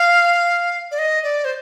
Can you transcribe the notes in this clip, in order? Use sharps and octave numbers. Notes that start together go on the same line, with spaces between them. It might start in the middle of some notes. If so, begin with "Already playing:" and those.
Already playing: F5
D5
D#5
D5
C5